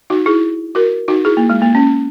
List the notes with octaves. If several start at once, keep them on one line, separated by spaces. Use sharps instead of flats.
D#4 F#4
E4 G#4
F#4 A#4
D#4 F#4
E4 G#4
A#3
G#3
A#3
C#4